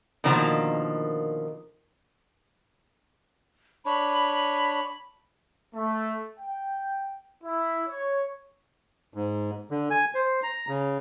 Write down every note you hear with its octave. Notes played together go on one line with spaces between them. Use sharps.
B2 D3 D#3 F3 A#3
D4 C#5 B5
A3
G5
E4
C#5
G#2
D3
G#5
C5
A#5
C#3